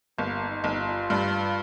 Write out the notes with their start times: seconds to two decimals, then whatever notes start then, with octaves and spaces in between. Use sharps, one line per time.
0.18 G1 A#3
0.49 D#4
0.64 G1
0.79 F4
1.10 G2